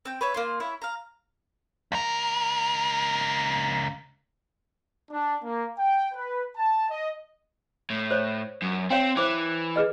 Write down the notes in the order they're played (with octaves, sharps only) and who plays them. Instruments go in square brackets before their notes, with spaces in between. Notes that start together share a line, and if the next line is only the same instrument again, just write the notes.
[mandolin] C4 G5
B4 C#5 E5
A#3 F4 C6
E4 C#5 E5
F5 A#5
[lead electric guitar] C#2 A#4
[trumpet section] D4
A#3
G5
B4
A5
D#5
[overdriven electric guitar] A2
[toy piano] C5 C#5
[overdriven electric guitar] F#2
[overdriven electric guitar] C4 [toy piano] C#5 F5 G5
[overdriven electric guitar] E3 [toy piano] C5 D6
[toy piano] G#4 B4 D#5